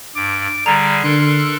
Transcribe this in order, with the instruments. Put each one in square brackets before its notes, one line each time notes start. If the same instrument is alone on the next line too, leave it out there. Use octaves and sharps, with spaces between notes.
[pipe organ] G2 [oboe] D6
[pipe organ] D3 G3 [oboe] G#4 [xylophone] A#5
[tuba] D3 [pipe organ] A4 A#4 F#6 [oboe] C6